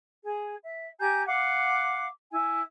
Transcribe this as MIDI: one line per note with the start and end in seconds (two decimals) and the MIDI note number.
0.24 0.55 68
0.63 0.87 76
1.00 1.22 67
1.00 1.22 80
1.00 1.22 82
1.00 1.22 91
1.27 2.06 77
1.27 2.06 78
1.27 2.06 86
2.31 2.60 64
2.31 2.60 80